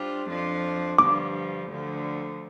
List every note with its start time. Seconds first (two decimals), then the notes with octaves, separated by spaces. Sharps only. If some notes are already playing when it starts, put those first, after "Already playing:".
Already playing: G3 D4 F4 C5
0.29 F2 F3 D4 F4
0.98 G2 D3 F3 D6
1.69 D2 D3 F3